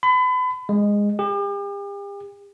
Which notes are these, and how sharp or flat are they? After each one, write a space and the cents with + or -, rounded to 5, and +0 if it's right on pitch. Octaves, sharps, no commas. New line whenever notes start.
B5 +35
G#3 -15
G4 +40